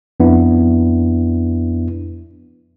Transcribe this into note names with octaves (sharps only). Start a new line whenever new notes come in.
F2 B3 D4 E4